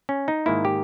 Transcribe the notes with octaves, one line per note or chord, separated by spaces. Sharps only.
C#4
D#4
G#2 D#3 A#3 E4
G4